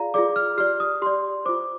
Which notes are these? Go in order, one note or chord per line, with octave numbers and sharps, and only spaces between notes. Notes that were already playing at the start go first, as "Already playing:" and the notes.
Already playing: F4 G#4 D5 F5 A#5
F4 G#4 D5 D6
F6
G4 D5 F6
D#6
G4 D5 C6
F4 C5 D6